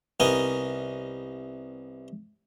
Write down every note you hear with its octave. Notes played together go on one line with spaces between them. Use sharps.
C2 B3 D#4 A#4 D#5 G#5